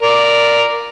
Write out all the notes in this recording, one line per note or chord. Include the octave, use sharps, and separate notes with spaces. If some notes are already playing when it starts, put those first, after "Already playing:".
A#4 D5